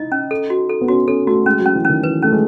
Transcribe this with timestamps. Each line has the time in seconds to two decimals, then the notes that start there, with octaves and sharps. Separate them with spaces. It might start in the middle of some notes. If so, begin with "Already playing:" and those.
Already playing: D#4 E4 D#5
0.12 C#4
0.31 A4
0.50 F#4
0.69 A4
0.81 B3
0.88 C#4 F#4
1.07 C#4 A4
1.27 A3 F#4
1.46 G#3 C#4
1.60 F#3
1.66 C#4
1.75 E3
1.85 D#3 C#4
2.03 E3 B4
2.22 A3 C#4
2.32 G#3